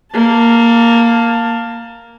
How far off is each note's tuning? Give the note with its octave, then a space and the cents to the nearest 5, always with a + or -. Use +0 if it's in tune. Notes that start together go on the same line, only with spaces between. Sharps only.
A#3 +0 A5 +20